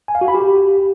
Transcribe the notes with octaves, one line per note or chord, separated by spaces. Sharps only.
G#5
F5
F#4
B5
G4